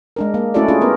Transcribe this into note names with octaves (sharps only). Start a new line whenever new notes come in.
G#3 D4 A#4
A#3
A3 C#4 E4 F#4 A4 D5
C#4 D4 F4 G#4
B3 A#4